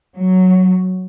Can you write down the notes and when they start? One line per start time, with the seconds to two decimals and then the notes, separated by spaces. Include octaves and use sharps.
0.16 F#3